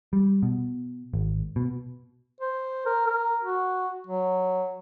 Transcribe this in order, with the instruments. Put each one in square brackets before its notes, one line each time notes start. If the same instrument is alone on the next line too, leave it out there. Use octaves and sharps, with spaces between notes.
[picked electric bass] G3
B2
G#1
B2
[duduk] C5
A#4
A#4
F#4
F#3